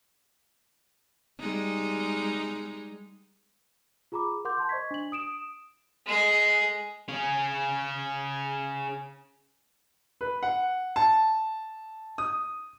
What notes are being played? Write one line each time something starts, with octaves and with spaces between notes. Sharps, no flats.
G3 G#3 D#4
F4 G#4 A#5 B5 D6
A#4 F#5 C6 D6 G6
A5 C6 G6
C5 D#5 C#6 G#6 B6
D4 F#7
D#6 D7 E7
G#3 G#4
C#4 G#4
B4
F#5
A5
D#6